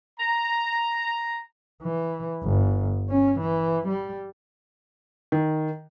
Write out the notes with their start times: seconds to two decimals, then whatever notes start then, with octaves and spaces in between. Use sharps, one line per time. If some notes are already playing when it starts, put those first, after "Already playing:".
0.19 A#5
1.83 E3
2.43 G1
3.10 C#4
3.41 E3
3.88 G3
5.32 D#3